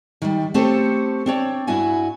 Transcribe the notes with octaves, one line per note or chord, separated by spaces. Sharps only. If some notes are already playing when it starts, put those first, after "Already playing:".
D#3 G3
A3 C4 G4 A4 C5 C#5
C4 D4 C#5
G2 E4 F#4 G#5